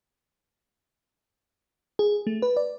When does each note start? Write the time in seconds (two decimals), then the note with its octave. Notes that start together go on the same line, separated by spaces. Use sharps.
1.99 G#4
2.27 A3
2.42 B4
2.57 D5